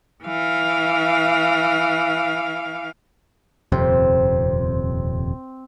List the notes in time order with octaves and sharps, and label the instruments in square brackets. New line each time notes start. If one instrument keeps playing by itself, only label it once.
[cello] E3 F5
[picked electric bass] D#1 F2 C3 [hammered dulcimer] C4